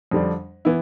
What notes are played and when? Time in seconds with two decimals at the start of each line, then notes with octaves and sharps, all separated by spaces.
0.11 F2 D3 G3 D4
0.65 E3 B3 E4